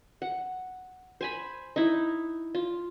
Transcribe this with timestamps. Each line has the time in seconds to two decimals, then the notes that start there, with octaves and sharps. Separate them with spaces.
0.22 F#5
1.21 C5 G#5 B5
1.76 D#4 E4
2.55 F4